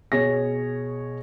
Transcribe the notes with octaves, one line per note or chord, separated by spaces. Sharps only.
B2 G#4 C#5 A#6